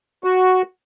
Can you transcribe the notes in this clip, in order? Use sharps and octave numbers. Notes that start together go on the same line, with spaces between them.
F#4